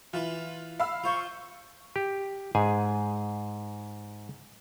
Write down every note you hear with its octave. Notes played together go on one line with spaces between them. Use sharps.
E3 F4 B4
F5 B5 E6
F4 C5 C#6
G4
G#2 G#4 G#5